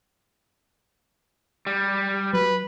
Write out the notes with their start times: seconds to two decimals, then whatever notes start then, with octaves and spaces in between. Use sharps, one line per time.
1.67 G3
2.33 F#3 B4